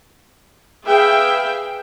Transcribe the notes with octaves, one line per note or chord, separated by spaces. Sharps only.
G#4 B4 E5 F5 G5